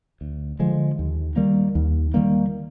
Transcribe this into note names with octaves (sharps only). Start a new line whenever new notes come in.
D2
D3 F3 G#3
D#2
D#3 G3 A#3
D#2
D#3 G3 A#3